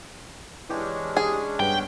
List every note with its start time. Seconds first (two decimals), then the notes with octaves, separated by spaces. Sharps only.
0.69 E3 G#3 C#4 D4 G4
1.17 G#4
1.60 G2 B3 G5 B6